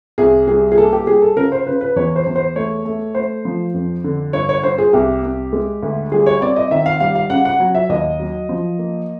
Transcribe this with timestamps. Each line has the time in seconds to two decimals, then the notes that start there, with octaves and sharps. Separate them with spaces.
0.18 C2 G#4
0.47 G3 G#4
0.72 G#4
0.78 A#3 A4
0.93 G4
1.07 G3 G#4
1.22 A4
1.36 C#3 A#4
1.52 C5
1.66 C#3 B4
1.81 B4
1.96 E2 C#5
2.16 C5
2.26 E2
2.36 C5
2.56 A3 C#5
2.85 A3
3.15 A3 C5
3.45 F3
3.74 F2
4.04 D3
4.33 G2 C#5
4.49 C#5
4.63 G2 C5
4.78 G#4
4.93 C2 G4
5.23 C2
5.53 G#3
5.83 D2
6.12 G3 G#4
6.26 C#5
6.41 C4 D5
6.56 D#5
6.71 D#3 E5
6.86 F5
7.00 G3 F5
7.15 F5
7.30 C#3 F#5
7.45 F#5
7.60 F#3
7.75 E5
7.89 D#2 D#5
8.20 F#3
8.49 F3
8.79 A#3